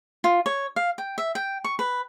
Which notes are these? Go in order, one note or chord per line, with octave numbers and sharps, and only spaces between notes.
F4
C#5
F5
G5
E5
G5
C#6
B4